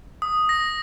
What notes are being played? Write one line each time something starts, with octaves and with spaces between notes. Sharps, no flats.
D#6
A#6